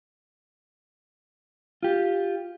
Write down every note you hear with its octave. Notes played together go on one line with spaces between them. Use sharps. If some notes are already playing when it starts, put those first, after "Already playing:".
F4 G4